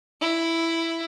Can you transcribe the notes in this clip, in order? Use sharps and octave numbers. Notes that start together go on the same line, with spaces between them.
E4